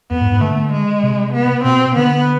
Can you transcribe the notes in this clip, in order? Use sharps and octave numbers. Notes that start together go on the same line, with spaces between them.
F2 B3
G#2
G#2
D3 A3
G#3
C3
B3
B2 C4
D3 B3